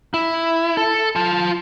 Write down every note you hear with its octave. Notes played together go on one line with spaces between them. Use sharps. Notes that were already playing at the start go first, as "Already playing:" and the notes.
E4
A4
F4 A5